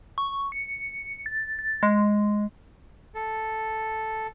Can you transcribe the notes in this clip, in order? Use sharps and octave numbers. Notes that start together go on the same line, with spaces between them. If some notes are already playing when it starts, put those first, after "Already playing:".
C#6
C#7
A6
A6
G#3
A4